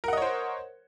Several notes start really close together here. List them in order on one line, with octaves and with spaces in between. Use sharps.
A#4 F#5 D#5 C#5 C5